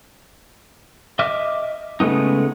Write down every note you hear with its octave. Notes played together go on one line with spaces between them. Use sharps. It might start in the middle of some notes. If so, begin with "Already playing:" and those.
D#5 E5 D6 F6
C#3 G#3 A3 B3 D#4